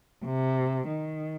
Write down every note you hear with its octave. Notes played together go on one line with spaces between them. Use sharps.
C3
D#3